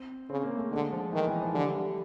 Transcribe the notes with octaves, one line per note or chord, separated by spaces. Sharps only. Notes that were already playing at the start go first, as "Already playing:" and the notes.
Already playing: C4
C#3 C4
A#3
A3
D3 G#3
F3
D#3 E3
E3
F3
D3 G3
G3